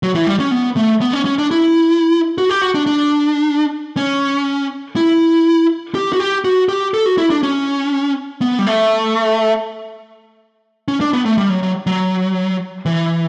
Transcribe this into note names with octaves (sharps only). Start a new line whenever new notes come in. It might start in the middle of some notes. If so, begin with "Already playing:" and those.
F#3
E3
G3
C#4
B3
A3
B3
C#4
C#4
D4
E4
F#4
G4
F#4
D4
D4
C#4
E4
G4
F#4
G4
F#4
G4
A4
F#4
E4
D4
C#4
B3
G3
A3
C#4
D4
B3
A3
G3
F#3
F#3
F#3
E3